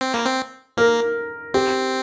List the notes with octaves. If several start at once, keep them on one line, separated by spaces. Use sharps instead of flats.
C4
A#3
C4
A#3 A#4
C4 G4